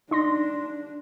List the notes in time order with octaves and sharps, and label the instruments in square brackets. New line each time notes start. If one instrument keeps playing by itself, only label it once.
[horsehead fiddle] D4 [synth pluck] D#4 C6 A#6